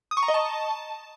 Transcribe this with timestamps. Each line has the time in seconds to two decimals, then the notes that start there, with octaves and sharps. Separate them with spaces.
0.11 D#6
0.17 C#6
0.23 A#5
0.28 D#5
0.34 A5